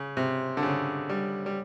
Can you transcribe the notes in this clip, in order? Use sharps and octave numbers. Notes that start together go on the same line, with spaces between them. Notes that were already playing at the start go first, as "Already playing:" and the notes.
Already playing: C#3
C3
D3
C#3
G3
G3